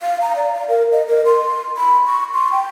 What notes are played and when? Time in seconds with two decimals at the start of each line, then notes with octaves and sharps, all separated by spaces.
0.01 F5
0.22 A#5
0.36 D5
0.53 F5
0.69 A#4
0.92 D#5
1.08 A#4
1.26 C6
1.77 B5
2.07 C#6
2.34 C6
2.52 G5